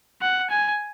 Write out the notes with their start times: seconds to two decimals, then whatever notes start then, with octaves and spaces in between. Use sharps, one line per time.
0.22 F#5
0.50 G#5